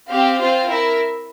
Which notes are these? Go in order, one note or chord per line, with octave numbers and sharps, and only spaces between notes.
C4 G4 C5 F5
C4 F4 C5 F5
E4 A#4 E5